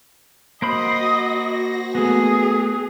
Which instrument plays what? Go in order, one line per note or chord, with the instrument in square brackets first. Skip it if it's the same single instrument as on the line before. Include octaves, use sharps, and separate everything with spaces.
[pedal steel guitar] A#3 C5 B5 [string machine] F#4 A#6 [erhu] D#5
[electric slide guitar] A3 B3 [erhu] G#4